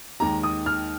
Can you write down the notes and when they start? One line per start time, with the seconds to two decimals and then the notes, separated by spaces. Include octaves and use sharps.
0.20 D#2 D#3 G#3 A#5
0.43 D#6
0.66 F6